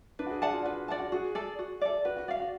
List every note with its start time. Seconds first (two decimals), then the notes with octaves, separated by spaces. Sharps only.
0.19 D4 B4
0.26 F#4
0.30 G#4
0.42 F#4 D5 F#5 A5
0.53 F4
0.65 F#4 B4
0.88 D5 F#5 A5
1.00 F#4
1.12 F#4 G#4
1.35 A4 D5
1.59 F#4
1.81 A4 D5
2.05 F#4 B4
2.17 F#4
2.28 F#4 D5 F5
2.40 F#4